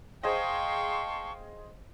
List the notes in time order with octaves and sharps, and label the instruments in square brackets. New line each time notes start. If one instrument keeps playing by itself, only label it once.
[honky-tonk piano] G#4 C5 D#5 [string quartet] F5 G5 [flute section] A5 C6 C#6